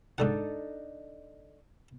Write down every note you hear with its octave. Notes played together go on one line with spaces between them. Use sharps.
G#2 D3 D4 D#4 A4 F#5